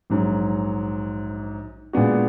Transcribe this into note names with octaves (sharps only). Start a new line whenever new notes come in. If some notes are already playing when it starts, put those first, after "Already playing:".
A#1 G#2 F#3
A#2 G#3 B3 D4 F#4